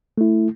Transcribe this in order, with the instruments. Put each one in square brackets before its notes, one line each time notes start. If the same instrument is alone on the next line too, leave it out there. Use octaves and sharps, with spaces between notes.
[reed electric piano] A3 E4